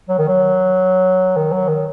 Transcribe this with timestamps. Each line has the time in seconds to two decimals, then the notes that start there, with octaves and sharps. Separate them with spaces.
0.09 F#3
0.18 D#3
0.28 F#3
1.36 D#3
1.52 F#3
1.68 D#3